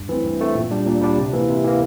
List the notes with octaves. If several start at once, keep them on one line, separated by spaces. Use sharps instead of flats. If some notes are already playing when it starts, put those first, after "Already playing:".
Already playing: G2
E3 A3 C4
G2
E3 A3 C4
A#2
G3 D4 G4
A#2
G3 D4 G4
C3
E3 A#3
C3
E3 A#3